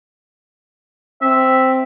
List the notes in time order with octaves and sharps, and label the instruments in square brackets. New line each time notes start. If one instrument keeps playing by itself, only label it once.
[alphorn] C4 [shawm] E5